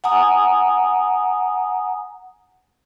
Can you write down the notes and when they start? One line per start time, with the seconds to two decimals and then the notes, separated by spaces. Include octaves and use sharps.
0.04 F#5 G#5 A#5 D#6